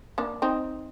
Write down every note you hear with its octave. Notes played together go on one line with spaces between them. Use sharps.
A#3 D4
C4 D#4